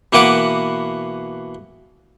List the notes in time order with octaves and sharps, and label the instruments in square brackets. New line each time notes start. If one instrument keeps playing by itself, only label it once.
[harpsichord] B2 E3 A#3 B4 F#5 D6